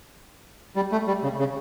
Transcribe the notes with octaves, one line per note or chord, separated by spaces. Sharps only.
G3
A3
G3
C#3
C#3